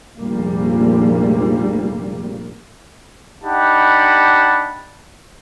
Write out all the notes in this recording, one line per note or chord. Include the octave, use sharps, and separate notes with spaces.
F1 A#1 G3 A#3
D4 D#4 G4 F#5 A5 B5